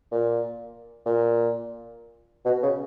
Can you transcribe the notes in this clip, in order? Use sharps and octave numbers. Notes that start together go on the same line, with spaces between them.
A#2
A#2
B2
C#3